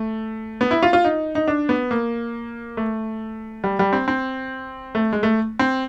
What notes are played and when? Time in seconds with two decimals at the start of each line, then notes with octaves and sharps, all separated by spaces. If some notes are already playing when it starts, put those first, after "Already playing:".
Already playing: A3
0.61 B3
0.71 E4
0.83 F4
0.93 F4
1.05 D#4
1.35 D#4
1.48 D4
1.69 B3
1.91 A#3
2.77 A3
3.64 G3
3.79 G3
3.93 C4
4.08 C4
4.95 A3
5.13 G#3
5.23 A3
5.59 C4